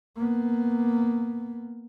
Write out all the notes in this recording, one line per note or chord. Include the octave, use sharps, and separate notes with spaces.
A#3 B3